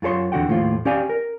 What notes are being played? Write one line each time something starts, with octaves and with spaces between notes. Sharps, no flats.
F#2 F4 A4 C#5 C6
E2 D3 F#4 F#5 G5
D#2 A2 F3 F4
C#4 G4 D5 F5 G#5
A#4